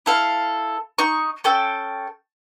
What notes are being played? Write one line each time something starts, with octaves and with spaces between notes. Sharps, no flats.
E4 A4 F5
D#4 C#6
C#4 A4 G5 E6